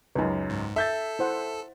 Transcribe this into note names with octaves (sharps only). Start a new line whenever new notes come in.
C#2 F#2 D#4 B4
G#2
A4 E5 G6 A6
E4 C5 F#5